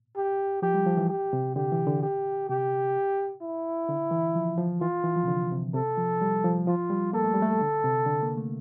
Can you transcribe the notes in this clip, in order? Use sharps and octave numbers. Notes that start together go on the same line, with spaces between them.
G4
F3 G4
G3
F3
E3
G4
C3
D3 G4
E3
D3
G4
C3 G4
E4
D3
E3
F3
F3
E3 F4
E3
F3
C3
D3
C3
C3 A4
F3
G3
F3
F3 F4
G3
A#3 A4
A3
G3
A3
D3
C3
D3
A#3
A3